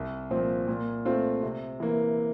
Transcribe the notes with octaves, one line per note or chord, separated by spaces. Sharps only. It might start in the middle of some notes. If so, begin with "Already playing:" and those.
Already playing: C2
A#2 F3 C4
A#2
A3 C4 F4
C3
E3 A#3